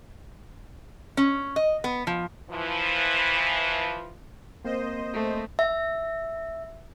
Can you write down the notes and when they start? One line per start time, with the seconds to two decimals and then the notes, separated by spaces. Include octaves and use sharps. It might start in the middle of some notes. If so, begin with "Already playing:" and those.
1.17 C#4
1.56 D#5
1.84 B3
2.07 F3
2.51 E3 F3
4.65 A#3 C4 A#4 C5 D#5
5.14 A3
5.59 E5